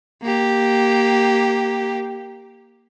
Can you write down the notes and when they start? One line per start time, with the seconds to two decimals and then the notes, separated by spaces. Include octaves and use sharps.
0.22 A#3 G4